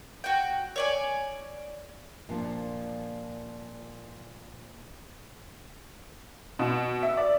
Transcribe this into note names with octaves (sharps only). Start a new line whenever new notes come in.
F#4 G5
C#5 D5 G#5
A#2 F3 D4
B2
E5
D5